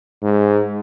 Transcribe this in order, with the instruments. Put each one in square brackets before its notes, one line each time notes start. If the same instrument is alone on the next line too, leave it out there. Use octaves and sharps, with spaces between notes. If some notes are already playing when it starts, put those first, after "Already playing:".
[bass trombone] G#2